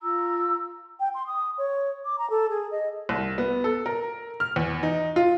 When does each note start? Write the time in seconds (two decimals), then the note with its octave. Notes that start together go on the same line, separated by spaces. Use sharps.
0.02 F4 A#5 E6
1.00 G5
1.15 C6
1.27 D#6
1.58 C#5
2.05 D6
2.18 A#5
2.30 A4
2.50 G#4
2.71 D#5
3.09 C2
3.38 B3
3.64 A4
3.86 A#4
4.40 F6
4.56 E2
4.83 D#4
5.16 F4